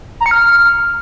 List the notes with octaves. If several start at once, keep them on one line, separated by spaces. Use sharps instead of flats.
A#5
C#7
F6